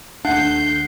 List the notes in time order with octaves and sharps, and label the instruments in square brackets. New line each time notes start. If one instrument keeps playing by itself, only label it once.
[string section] D#2 A3 G6 [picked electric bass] D4 [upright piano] F#5 [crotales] C7